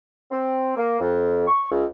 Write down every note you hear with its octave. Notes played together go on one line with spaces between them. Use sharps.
C4
A#3
F2
C#6
C#2